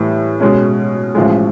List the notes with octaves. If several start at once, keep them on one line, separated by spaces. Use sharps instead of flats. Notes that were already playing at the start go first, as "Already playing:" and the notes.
Already playing: A2 E3 G3
B2 G#3 C#4
A1 A2 F3 G#3